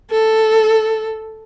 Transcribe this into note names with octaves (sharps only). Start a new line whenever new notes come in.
A4